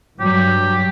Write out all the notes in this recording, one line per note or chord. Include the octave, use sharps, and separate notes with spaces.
G2 F#3 G4